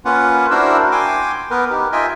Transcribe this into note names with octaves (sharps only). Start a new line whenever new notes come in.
A#3 C#4 F4 B4 F#5
D4 E4 F#4 A#4 C5 E6
G5 G#5 C6 D6
B3 A#4 B4
D#4 G4
F4 D#5 E5 G5 G#5